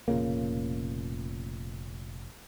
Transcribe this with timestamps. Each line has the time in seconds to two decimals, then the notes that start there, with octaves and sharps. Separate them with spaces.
0.08 F1 A#2 C#3 A#3